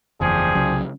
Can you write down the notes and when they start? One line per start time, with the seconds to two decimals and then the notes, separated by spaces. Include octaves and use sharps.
0.21 F#1 E2 F3 G3 G#4
0.55 C2 C#3 F#3